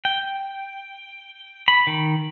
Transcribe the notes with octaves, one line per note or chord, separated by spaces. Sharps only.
G5
B5
D#3